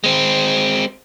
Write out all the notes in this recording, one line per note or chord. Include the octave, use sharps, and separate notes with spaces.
G#3 C4